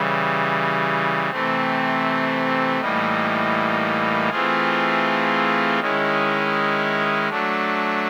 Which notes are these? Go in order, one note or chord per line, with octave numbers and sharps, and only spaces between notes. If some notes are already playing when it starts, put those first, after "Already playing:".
Already playing: C#3 E3 G3
C3 E3 A3 C4
A2 E3 G3 A#3 D#4
E3 A3 C4 F4 G#4
D#3 G#3 C#4 E4
F#3 A3 D4